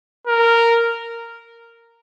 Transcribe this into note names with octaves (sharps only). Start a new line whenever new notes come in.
A#4